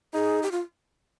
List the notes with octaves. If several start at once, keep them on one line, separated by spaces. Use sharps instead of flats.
D#4 G#4
G4
F4